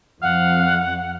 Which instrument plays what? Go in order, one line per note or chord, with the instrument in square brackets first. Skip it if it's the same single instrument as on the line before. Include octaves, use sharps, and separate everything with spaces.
[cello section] F2 [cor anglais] F5 [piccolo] F#5